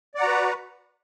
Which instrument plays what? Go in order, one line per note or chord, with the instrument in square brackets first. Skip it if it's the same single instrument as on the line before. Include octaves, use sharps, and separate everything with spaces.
[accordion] D5
F#5
A#5
F#4
B4